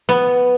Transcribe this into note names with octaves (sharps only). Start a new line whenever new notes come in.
B3